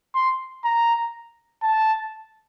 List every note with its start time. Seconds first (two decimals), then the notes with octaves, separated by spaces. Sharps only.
0.15 C6
0.64 A#5
1.63 A5